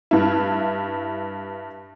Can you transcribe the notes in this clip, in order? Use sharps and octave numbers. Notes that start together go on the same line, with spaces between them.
G2 E4